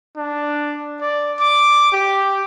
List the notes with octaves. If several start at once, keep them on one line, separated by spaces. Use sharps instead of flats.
D4
D5
D6
G4